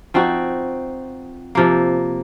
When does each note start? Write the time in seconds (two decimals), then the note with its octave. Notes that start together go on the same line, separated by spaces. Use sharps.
0.14 F3 C4 D#4 F#4
1.55 C3 F3 A#3